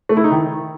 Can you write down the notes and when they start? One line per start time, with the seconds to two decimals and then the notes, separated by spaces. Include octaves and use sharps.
0.09 A3
0.17 E4
0.24 D#4
0.31 D#3